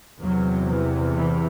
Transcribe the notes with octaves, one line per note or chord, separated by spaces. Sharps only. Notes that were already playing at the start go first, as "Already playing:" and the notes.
E2 C3 F#3
E3
E3